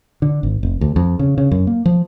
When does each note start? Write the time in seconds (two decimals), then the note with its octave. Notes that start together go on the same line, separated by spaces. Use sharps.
0.22 D3
0.43 G#1
0.63 F1
0.81 D2
0.96 F2
1.19 C#3
1.38 C#3
1.51 F#2
1.67 A#3
1.85 F3